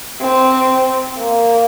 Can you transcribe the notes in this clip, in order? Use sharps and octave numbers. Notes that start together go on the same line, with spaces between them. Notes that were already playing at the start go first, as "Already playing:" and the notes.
C4
A#3